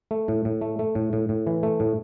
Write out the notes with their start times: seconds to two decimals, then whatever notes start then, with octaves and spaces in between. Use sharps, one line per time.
0.11 A3
0.28 A2
0.45 A2
0.61 A3
0.79 A3
0.95 A2
1.13 A2
1.29 A2
1.47 E3
1.63 A3
1.80 A2